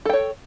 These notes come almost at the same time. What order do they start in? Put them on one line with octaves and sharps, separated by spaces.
A4 G5 C#5